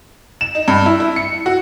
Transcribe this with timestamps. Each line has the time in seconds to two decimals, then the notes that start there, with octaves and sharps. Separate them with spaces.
0.41 E7
0.55 D#4
0.68 G2
0.86 E4
1.00 E4
1.16 C#7
1.46 F#4